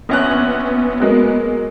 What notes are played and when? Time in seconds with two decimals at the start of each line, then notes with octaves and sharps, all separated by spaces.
0.09 A#1 B3 C#4 F#6
1.00 F#3 G#3 A#3